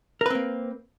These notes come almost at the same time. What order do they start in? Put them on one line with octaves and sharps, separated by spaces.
A#4 B4 C4 A#3